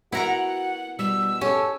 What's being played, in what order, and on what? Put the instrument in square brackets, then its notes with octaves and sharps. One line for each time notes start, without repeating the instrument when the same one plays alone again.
[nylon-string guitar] B3 [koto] E4 A#4 A#5 [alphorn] F#4 [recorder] F#5
[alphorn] B2 [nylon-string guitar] G3 [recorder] E6
[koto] C#4 [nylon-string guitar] G4 A4